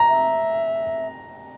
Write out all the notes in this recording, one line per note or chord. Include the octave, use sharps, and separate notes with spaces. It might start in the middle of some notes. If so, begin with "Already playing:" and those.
Already playing: A#5
E5